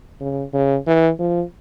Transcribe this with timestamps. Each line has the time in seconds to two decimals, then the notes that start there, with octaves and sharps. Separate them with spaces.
0.20 C#3
0.53 C#3
0.87 E3
1.19 F3